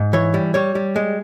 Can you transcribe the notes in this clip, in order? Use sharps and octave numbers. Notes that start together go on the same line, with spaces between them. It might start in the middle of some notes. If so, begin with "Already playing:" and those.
Already playing: G#2
E3 C#5
G3
G3 C#5
G3
G#3